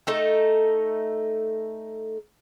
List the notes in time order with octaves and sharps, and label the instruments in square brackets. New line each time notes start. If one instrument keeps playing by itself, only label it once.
[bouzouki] A3 D#4 A4